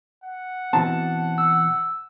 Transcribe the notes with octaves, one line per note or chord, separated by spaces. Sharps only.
F#5
B2 E3 C4 A5
E6